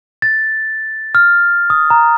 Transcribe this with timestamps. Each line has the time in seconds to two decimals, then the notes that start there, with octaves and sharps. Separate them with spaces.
0.22 A6
1.15 F6
1.70 D#6
1.90 A#5